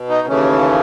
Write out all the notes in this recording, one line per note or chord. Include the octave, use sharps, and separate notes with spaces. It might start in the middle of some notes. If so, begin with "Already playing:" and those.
Already playing: B2
D#4
D#2 C#3 E3 A3 C#4